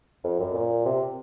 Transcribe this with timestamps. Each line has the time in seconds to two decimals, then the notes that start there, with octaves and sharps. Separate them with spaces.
0.24 F2
0.40 F#2
0.55 A#2
0.86 C3